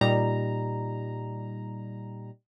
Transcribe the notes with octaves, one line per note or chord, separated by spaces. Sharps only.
A#2 G3 D#4 A#5